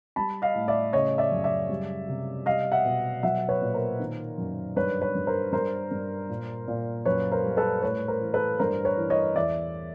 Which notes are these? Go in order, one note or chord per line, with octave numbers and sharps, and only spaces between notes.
G3 A5 B5
D#5 F5
A2
D5 E5
C#3 C#5 D#5
D5 E5
F#2
D5 E5
G3
C3
G3 D#5 F5
E5 F#5
B2
F#3 E5 F#5
B4 C#5
A#2
A#4 C5
D#3
F#2
G2 B4 C#5
B4 C#5
G2
A#4 C5
G2 A#4 C5
G2
A#2
A#2
F#2 B4 C#5
A#4 C5
G3
A4 B4
A2 B4 C#5
A#4 C5
E3
A4 B4
G2 A#4 C5
B4 C#5
E3
C#5 D#5
E2 D5 E5